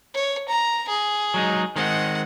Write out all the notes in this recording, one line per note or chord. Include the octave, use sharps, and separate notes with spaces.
C#5
A#5
G#4
F#3 G#3 D#4
D#3 G#3 C4 F#5